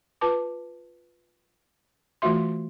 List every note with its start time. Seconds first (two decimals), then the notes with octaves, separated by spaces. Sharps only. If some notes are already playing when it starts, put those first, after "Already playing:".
0.21 F4 B4 A5 D6
2.22 E3 A3 F4 F#4 E5 C6